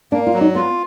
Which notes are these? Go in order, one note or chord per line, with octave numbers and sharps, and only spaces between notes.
A#3 D4
F4
F#3
D#4
B3 F4